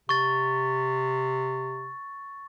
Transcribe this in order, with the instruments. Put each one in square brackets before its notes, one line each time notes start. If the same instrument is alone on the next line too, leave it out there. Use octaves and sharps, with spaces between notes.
[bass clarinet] C3 [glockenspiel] C#6 A6